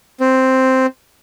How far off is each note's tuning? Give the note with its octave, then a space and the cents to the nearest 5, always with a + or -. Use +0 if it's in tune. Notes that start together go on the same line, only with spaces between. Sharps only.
C4 +0